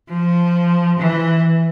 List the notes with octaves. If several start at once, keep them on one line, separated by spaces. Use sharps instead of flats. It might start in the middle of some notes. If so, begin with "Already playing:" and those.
F3
E3